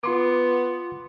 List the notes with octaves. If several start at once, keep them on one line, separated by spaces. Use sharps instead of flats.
B3 F4 C6 D6